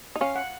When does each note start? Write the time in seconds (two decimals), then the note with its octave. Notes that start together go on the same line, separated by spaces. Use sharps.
0.16 D#4
0.21 C#4 F5
0.36 F#5